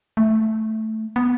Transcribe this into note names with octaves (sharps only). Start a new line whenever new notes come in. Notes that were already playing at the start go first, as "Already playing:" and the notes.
A3
B3